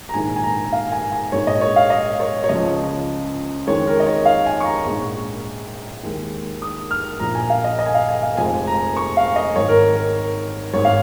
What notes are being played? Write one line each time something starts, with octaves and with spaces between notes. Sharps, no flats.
A#5
A#1 G#2 D#3 G#3 G#5
G#5
A#5
F5
G#5
G#5
A#1 G#2 G#3 C#5
D#5
C#5
F5
D#5
C#5
C#5
C#2 C#3 F3 D#5
F2 D#3 G#3 C#5
A#4
D#5
C#5
F5
G#5
C#6
A#5
A#1 G#2 G#3
D#2 D#3 G#3
D#6
F6
A#1 A#2 F3 A#5
G#5
F5
D#5
D#5
G#5
F5
G#5
F5
F1 F2 F3 G#3 G#5
A#5
C#6
F5
D#5
G#1 G#2 D#3 C#5
A#4
A#4
G#1 G#2 G#3 C#5
F5